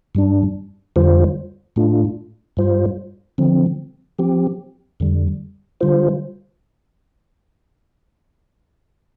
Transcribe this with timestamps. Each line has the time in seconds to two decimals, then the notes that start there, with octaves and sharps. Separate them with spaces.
0.15 G2 G3 D4
0.96 F2 D3 G3 F4 C5
1.76 A2 A3 D4 F4
2.57 G2 G3 F4 C5
3.38 D3 F3 C4
4.19 F3 C4 G4
5.00 F2 D3 G3
5.81 D3 G3 F4 C5